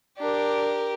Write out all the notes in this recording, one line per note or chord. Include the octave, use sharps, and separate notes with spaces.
D4 G4 A#4